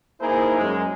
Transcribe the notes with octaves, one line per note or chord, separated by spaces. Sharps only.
A#3 D#4 E4 G#4 A#4 C5
F#2 G#3